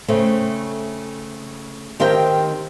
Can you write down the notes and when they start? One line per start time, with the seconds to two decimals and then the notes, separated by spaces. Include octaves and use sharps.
0.08 C#3 A3 C4
2.00 D#3 C4 G4 A#4 G5